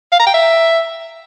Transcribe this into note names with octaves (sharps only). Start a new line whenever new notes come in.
F5
A#5
G5
E5